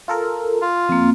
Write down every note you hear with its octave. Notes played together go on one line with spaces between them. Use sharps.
F4 A4 A#4
F4
F2 A#3 C4